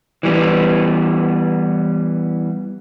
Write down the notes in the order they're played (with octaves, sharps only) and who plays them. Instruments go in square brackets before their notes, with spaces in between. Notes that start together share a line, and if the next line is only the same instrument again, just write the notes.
[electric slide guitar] E3 G3 B3